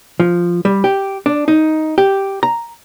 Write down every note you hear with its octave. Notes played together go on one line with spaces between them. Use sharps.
F3
G3
G4
D4
D#4
G4
A#5